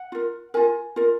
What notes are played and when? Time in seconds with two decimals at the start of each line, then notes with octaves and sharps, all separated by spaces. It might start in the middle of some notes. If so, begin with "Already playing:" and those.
Already playing: F#5
0.12 F4 A#4
0.54 F4 A#4 G#5
0.96 F4 A#4